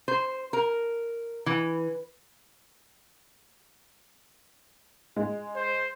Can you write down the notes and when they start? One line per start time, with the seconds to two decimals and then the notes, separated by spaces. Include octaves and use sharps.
0.08 C5
0.53 A#4
1.46 E3
5.16 G#3
5.55 C5